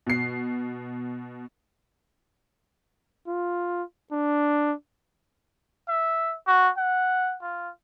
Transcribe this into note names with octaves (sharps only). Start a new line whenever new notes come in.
B2 C7
F4
D4
E5
F#4
F#5
F4